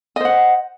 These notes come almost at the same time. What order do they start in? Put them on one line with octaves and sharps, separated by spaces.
D#5 C5 F#5